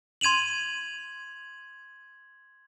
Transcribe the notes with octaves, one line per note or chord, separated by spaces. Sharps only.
C6 G#6 D#7 F7 F#7